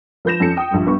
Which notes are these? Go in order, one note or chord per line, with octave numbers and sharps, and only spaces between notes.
F3 B4 G6 A#6 E7
F2 C#4 A4 C#7
G5 D#6
A#1 G2
G2 B3 C#6